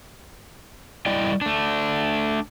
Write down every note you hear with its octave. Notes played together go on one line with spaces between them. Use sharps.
G3 E4 D5 D#5 G5
A3 D4